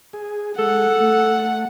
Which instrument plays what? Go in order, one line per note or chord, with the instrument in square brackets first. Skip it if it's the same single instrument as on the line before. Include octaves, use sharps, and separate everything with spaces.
[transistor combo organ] G#4
[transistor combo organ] G#3 [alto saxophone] A4 [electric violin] F#5
[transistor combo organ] A3